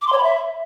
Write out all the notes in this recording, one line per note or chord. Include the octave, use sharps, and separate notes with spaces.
D6
C6
C#5
B5
E5